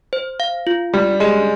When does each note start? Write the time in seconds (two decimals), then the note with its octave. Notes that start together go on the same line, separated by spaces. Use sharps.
0.13 C5
0.40 F5
0.67 F4
0.94 G3 G4
1.20 G#3 G4